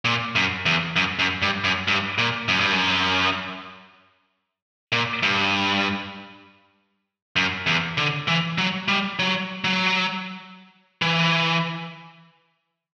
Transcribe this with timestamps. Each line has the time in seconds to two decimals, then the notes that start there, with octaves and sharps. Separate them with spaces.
0.05 A#2
0.35 F#2
0.66 E2
0.96 F#2
1.19 F#2
1.42 G2
1.64 F#2
1.88 G2
2.18 A#2
2.48 F#2
2.60 G2
2.72 F#2
4.92 A#2
5.23 G2
7.36 F#2
7.66 E2
7.97 D3
8.28 E3
8.58 F#3
8.88 G3
9.19 F#3
9.64 F#3
11.02 E3